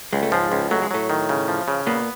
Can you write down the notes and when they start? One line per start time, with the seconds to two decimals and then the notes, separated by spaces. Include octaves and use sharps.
0.13 C#2 G#3
0.23 A3
0.32 G#2 F3 G#3
0.52 C#2
0.71 F#3 A3
0.82 G#3
0.91 A2 F#3 A3
1.10 D#3
1.29 C#3
1.48 F3
1.68 C#3
1.87 A#2 A#3 B3